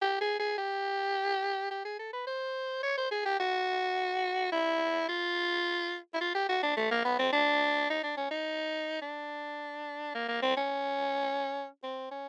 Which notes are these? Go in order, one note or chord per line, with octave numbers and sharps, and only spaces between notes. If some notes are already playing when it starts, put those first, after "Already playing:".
G4
G#4
G#4
G4
G4
G#4
A4
B4
C5
C#5
C5
G#4
G4
F#4
E4
F4
E4
F4
G4
F#4
D4
A3
A#3
B3
C4
D4
D#4
D4
C#4
D#4
D4
A#3
A#3
C4
C#4
C4
C#4